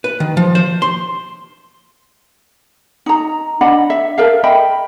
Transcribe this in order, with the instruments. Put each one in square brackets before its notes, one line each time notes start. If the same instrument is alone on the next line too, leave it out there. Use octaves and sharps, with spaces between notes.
[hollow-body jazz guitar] B4
D#3
F3
C5
C6
[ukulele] D#4 A#5
D4 D#5 F#5 B5
E5
A4 A#4 E5 F5
D#5 E5 G5 B5